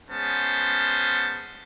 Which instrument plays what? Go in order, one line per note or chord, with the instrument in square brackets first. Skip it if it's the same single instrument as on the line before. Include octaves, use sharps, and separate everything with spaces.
[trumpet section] G#3 B3 C#4 C5 A5